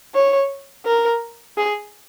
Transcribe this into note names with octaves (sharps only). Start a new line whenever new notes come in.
C#5
A#4
G#4